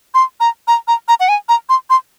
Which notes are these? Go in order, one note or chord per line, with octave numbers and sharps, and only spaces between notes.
C6
A#5
A#5
A#5
A#5
F#5
G#5
A#5
C6
C6